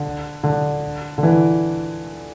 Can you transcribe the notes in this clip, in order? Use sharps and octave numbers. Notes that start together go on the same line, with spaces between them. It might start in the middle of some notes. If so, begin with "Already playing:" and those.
Already playing: D3
D3
D3
E3